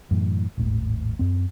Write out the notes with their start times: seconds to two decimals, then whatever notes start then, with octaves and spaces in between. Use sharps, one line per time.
0.11 F#2 A2 E3
0.57 D#1 G#1 A2
1.19 F#2 C4